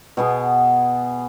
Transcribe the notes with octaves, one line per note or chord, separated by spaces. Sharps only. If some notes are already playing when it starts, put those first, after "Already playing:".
B2 B3 G#4